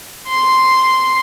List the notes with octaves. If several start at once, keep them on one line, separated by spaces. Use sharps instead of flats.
C6